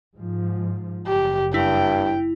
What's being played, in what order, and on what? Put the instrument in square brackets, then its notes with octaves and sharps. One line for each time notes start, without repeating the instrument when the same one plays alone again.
[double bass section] G#2 F3
[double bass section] F#1 [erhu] G4
[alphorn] G2 [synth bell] E4 [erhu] G5